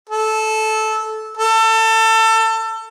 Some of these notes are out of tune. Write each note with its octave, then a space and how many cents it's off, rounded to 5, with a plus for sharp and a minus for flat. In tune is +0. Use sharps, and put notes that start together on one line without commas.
A4 -15
A4 +25